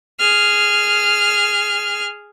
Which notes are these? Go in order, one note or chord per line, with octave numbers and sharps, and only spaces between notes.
G#4 F6